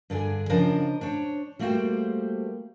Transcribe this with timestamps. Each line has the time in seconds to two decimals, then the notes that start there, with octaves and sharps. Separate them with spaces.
0.10 G2 D3 D4 G#4 G#5
0.49 C#3 F3 D4 A#4 C5 D#5
1.01 D4 C5 C#5
1.59 G3 A3 A#3 F#4 C5 G5